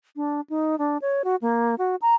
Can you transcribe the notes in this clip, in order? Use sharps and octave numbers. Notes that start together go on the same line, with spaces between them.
D4
D#4
D4
C#5
F#4
A#3
F#4
A#5